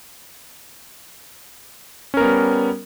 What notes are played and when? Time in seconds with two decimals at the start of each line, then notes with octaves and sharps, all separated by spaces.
2.14 C#4
2.17 A#4
2.20 B3
2.24 G3